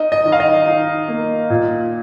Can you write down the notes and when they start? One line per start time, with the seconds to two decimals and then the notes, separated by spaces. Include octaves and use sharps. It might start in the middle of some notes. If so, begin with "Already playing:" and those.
Already playing: D#4 D#5
0.12 D#5
0.25 D#3
0.32 F5
0.40 D#5
0.68 D#4
1.08 A#3
1.50 A#2